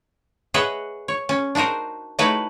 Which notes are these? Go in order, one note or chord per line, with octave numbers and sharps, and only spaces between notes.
G#4 B4 C#5 D#5 E5 F#5
C#5
C#4
D4 D#4 F#4 A#4 C5
A3 D#4 E4 F#4 B4 C#5